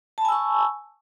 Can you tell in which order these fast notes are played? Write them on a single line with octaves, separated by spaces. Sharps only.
A5 B5 G#5 E6 C#6